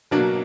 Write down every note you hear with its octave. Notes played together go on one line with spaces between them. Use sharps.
B2 F#3 A#3 D4